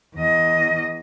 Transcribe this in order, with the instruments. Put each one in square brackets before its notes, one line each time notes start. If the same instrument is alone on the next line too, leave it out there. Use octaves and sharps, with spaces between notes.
[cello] E2 D#5